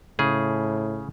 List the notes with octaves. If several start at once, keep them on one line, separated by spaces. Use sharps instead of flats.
A2 C#3 G#4